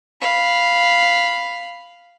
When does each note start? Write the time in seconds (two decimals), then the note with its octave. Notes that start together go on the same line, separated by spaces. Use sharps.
0.21 F5 B5